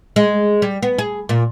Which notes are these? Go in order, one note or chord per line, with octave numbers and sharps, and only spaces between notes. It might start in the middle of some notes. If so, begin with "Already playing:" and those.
G#3
G3
B3
G#4
A#2